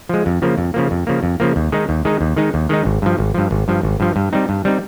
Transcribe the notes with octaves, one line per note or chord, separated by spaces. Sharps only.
F3 G#3
F2
C#3 F3 A#3
F2
C#3 F3 A#3
F2
C#3 F3 A#3
F2
C#3 F3 A#3
D#2
D#3 G#3 D#4
D#2
D#3 G#3 D#4
D#2
D#3 G#3 D#4
D#2
D#3 G#3 D#4
G#1
G2 F3
G#1
G2 F3
G#1
G2 F3
G#1
G2 F3
G2
G3 C4 D#4
G2
G3 C4 D#4